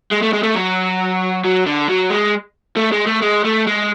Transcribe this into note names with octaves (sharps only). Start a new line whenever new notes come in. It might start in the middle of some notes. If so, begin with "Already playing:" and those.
G#3
A3
G#3
A3
F#3
F#3
D3
F#3
G#3
A3
G#3
A3
G#3
A3
G#3